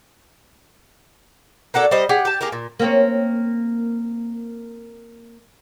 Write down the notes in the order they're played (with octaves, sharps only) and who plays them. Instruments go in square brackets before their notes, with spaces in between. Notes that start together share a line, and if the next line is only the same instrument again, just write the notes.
[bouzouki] A#3 F#4 A4 D5
G3 C5 D#5
G4 G#4 F#5
G4 A5
A#3 G4 G#4 A#4
A#2
[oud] A#3 C4 C#4